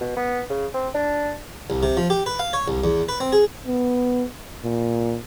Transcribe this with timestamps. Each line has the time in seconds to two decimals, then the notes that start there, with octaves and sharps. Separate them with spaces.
0.01 B2
0.17 B3
0.50 C#3
0.74 C4
0.94 D4
1.70 C2
1.83 C3
1.97 F3
2.10 G4
2.26 B4
2.39 F5
2.53 C#5
2.68 C2
2.84 E2
3.09 B4
3.20 C4
3.33 G#4
3.67 B3
4.64 A#2